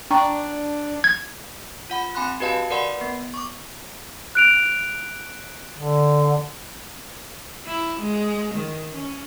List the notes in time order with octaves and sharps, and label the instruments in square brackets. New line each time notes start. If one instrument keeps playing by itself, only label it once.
[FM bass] D4 [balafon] G5 A#5 C#6
[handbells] G#6
F4 F#5 B5
C4 G#5 B5 C6 F#6
F#4 G4 B4 D#5 F5 A5
A#4 B4 D5 F#5 B5 C6
B3
C#6 D6
[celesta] F#6 D7 F7
[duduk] D3
[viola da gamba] E4
G#3
D#3
C#4